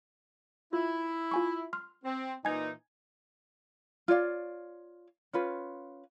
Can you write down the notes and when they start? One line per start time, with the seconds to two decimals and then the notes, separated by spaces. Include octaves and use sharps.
0.73 E4 F4
1.31 F4 G#5 C#6
1.73 C6 F6
2.04 C4
2.45 A#2 E3 D#4 G#5 G#6
4.08 F4 C#5 D5 F5
5.33 C#4 F4 B4